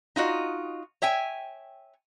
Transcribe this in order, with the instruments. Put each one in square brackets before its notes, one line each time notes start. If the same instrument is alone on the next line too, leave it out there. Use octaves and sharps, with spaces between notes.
[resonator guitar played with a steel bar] D#4 F4 F#4 D#5
C#5 E5 G5 G#5